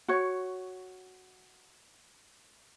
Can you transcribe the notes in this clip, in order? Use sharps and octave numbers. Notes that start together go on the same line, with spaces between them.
F#4 C#5